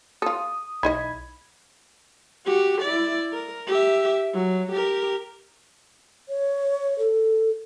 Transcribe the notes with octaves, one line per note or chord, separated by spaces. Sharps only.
F4 A4 D#6
B1 E3 D#4 D#5 B5 G#6
F#4 G4
E4 D5
A#4
G4 E5
F#3
G4 A#4
C#5
A4